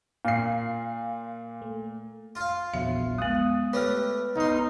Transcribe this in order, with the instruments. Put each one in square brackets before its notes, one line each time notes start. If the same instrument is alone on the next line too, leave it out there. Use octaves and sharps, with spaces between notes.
[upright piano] A#2 C7 [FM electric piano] F5
[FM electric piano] A3
[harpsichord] F4 F5
[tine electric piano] A#1 E2 F#3 [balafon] E5
[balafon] G#3 B3 [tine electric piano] D#6
[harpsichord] A3 G4 [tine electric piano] B4 F6 [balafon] C#5
[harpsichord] B1 C6 [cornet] D#4